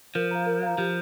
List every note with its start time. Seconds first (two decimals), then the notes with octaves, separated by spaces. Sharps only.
0.15 F3 A#4
0.31 F5 A#5
0.46 A#4
0.63 F5 A#5
0.78 F3 G4